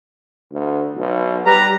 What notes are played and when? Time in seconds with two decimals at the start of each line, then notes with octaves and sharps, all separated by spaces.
0.52 D2
0.95 B1
1.46 G3 G4 B4 A#5